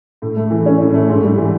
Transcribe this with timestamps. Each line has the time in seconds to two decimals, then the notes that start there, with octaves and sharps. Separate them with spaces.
0.22 A2
0.36 A3
0.51 E3
0.66 C#4
0.80 A2
0.94 A3
1.09 G#2
1.23 G3
1.38 E3